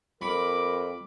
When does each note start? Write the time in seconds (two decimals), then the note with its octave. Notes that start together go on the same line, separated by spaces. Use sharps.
0.22 F2 A#4 B5 D6